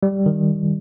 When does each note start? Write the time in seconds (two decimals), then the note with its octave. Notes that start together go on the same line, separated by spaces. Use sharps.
0.03 G3
0.26 D#3